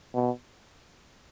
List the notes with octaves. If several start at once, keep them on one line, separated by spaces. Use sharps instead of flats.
B2